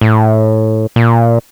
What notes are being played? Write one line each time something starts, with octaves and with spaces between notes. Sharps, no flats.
A2
A#2